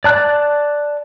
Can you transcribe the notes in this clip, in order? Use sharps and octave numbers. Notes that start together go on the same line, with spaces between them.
D5 A5 F#6